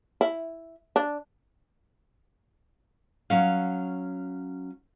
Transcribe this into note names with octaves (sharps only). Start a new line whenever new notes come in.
E4
D4
F#3 C#4 F5